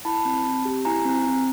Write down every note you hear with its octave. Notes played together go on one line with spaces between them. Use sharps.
E4 A5 B5
C4
C4
G4
E4 G#5 A#5
C4
C4